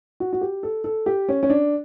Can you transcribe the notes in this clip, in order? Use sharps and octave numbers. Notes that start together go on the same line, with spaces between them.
F#4
F#4
G4
A4
A4
G4
C#4
C#4
D4